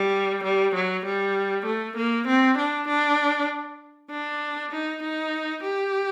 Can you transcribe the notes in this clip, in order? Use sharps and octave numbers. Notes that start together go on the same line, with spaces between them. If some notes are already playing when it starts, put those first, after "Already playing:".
Already playing: G3
G3
F#3
G3
A3
A#3
C4
D4
D4
D4
D#4
D#4
G4